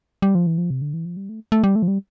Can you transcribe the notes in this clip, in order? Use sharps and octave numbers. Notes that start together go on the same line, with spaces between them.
G3
F3
E3
F3
C3
D3
E3
F3
G3
A3
A3
G3
A3
F3
G3